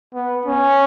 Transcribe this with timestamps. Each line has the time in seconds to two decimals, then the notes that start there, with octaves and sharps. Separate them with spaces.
0.15 B3
0.46 C#4